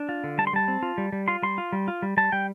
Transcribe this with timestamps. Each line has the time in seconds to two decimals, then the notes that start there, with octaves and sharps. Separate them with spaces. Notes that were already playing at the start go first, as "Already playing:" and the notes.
Already playing: D4
0.09 F4
0.24 D3
0.38 G3 A5
0.47 C6
0.53 G3 A5
0.68 C4
0.83 F4
0.98 G3
1.12 G3
1.28 F4 C6
1.43 G3 C6
1.58 F4
1.73 G3
1.88 F4
2.02 G3
2.17 G3 A5
2.32 G3 G5